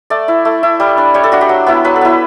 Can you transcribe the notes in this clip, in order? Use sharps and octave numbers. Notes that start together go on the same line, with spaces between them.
A3 D5
E4
A3
E4
G3
D4
G3 C#5
A4
D4 F#4
G4
F#3
B3 E4
F#3 B4
A4
B3 E4 B4